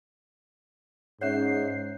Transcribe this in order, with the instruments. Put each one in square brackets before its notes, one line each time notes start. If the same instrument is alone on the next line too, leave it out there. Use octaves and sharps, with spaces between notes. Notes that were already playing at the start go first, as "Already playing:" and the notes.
[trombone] G#2 [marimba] C#4 E5 F#5 [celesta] C#5 F#6 G6 [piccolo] C7